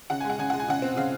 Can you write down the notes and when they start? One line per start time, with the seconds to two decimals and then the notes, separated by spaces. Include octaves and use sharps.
0.10 C#3 F#5
0.20 G#3 G#5
0.30 F#5
0.39 C#3 G#5
0.50 G#3 F#5
0.60 G#5
0.68 C#3 F#5
0.82 C4
0.97 C#3 F5